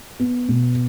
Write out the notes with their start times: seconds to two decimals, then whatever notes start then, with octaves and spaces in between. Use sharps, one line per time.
0.19 B3
0.49 B2